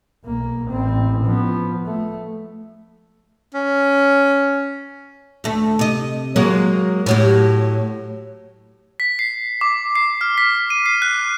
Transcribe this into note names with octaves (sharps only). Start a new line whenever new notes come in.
B1 A#3
A1 C4
F3 B3
A3
C#4
D2 A3
C3 D#5
F#3 G#3 A#3
A2 F#3 G4
B6
C7
D6
C7
F6
B6
D#7
C7
F#6